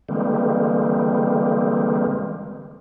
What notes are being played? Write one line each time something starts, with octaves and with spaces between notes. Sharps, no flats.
D3 E3 G3 G#3 A#3 C4